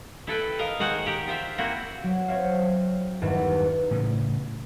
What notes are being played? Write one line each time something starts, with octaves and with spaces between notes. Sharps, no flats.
E4 A4 B4 G5
A#4 D#5 F5
D#3 F#4 G#4 C5 F#5
G4 A#4
F4 C5 E5
A#3 C4 E4 F#4
F#3
C4 C#5 E5 F5
E2 G2 D#3 E3
A2 C#3 E3